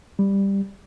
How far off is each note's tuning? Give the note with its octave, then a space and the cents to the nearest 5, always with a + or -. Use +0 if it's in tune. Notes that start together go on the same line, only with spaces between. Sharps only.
G3 +10